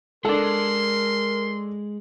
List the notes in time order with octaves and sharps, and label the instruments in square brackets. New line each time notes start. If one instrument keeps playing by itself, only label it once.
[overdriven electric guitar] G#3 [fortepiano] D4 A4 [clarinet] A#4 [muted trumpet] C6